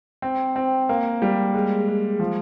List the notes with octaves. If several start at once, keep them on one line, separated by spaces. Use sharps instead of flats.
C4
C4
A#3
G3
G#3
G#3
F3